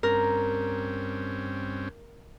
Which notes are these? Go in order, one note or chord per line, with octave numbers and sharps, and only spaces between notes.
G2 C4 C#4 A#4